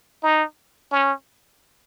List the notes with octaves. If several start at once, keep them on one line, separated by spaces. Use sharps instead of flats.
D#4
C#4